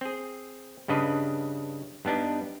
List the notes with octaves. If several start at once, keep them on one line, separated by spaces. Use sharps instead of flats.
C4 G#4
G2 C#3 D4 B4 D#5
G2 B3 D4 D#4